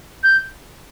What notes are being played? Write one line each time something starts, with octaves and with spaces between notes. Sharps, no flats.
G6